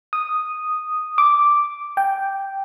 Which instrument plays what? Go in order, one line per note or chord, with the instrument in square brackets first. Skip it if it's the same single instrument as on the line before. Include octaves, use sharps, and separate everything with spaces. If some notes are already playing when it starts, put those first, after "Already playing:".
[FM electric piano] D#6
D6
G5